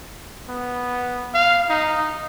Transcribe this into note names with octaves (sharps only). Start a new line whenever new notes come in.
B3
F5
D#4